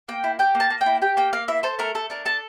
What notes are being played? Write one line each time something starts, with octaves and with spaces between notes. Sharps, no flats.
A#3 G5
E4
G4 G5
A#3
A5
A#3
G5
E4
G4 G5
A#3 G5
A#3 F5
E4 E5
A4 C5
A3 A#4
A3 A4
D4 A#4
A4 A5